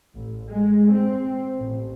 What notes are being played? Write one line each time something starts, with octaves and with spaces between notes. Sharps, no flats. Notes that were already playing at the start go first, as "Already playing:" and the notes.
A1
G#3
C4
A1